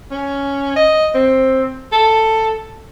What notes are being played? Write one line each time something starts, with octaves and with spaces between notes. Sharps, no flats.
C#4
D#5
C4
A4